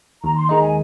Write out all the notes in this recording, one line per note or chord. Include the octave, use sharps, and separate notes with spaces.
D#2 A#5
C6
D#3 G#3 D#4 A#5
G#5